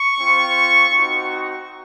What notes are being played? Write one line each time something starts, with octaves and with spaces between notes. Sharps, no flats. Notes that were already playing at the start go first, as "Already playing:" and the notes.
Already playing: C#6
C4 F4
C4 D#4 F#4